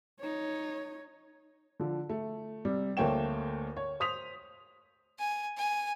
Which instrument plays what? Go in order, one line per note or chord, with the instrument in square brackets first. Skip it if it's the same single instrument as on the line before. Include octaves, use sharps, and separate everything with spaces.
[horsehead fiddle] D#4 C#5
[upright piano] D3 F3
A3
C3 G3
D2 A3 A#3 C#5 G5 E7
C#5
C5 D#6 B6 F7
[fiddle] G#5
G#5